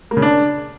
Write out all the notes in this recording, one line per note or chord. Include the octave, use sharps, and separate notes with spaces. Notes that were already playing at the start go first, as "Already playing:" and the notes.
A#3
C#3
D4